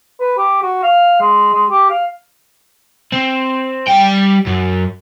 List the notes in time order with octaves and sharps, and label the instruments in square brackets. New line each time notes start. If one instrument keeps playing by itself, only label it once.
[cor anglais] B4
G4
F#4
F5
G#3
G#3
G4
F5
[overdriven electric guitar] C4
G3 G5
F#2